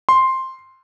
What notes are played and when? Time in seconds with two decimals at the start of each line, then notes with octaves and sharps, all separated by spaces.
0.09 C6